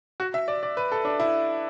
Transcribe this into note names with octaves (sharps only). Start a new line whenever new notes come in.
F#4
E5
D5
D5
B4
A4
D4
E4